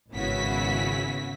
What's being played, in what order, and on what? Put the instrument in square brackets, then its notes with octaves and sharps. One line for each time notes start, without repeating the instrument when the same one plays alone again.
[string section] G#1 C#3 B3 E4 F#4 B6